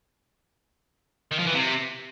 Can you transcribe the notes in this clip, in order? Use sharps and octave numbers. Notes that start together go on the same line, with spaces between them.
D#3
F3
E3
C3